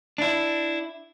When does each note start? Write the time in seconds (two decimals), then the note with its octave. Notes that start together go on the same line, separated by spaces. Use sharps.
0.18 D4 E4